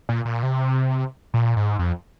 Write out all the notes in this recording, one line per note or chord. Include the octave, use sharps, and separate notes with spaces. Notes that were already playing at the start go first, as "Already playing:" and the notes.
A#2
A#2
C3
A#2
G#2
F2